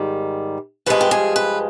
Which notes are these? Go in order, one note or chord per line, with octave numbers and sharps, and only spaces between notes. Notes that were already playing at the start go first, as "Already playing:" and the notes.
Already playing: G#2 D#3 G3
G2 F3 G#3 B4
G4
G#4
B4